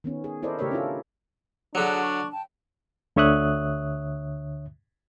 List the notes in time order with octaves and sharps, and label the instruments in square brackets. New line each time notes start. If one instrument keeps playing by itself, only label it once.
[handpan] D#3 B3 C#4
G#4
E4 A4 A#4 C5 D5 D#5
C#3 A3 G4 A#4 C#5 E5
C#4 D4 E4 F4 A4
[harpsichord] D3 F#3 [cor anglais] D4 [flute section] F#4 G#4 F#6
[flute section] C#6
G5 A5
[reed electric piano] D2 D3 C#5 E5 D#6 F#6